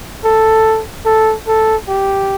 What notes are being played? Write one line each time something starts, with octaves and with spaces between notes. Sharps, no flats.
A4
A4
A4
G4